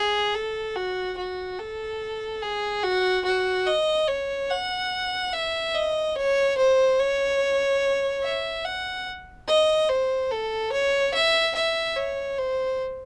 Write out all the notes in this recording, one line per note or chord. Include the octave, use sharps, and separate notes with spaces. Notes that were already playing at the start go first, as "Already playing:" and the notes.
Already playing: G#4
A4
F#4
F#4
A4
G#4
F#4
F#4
D#5
C#5
F#5
E5
D#5
C#5
C5
C#5
E5
F#5
D#5
C5
A4
C#5
E5
E5
C#5
C5